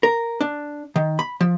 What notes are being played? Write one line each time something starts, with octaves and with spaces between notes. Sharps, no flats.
A#4
D4
D#3
B5
F3